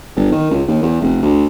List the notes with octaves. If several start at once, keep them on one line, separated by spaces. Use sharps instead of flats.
G1
D#3
C#2
D#2
E2
F1
D2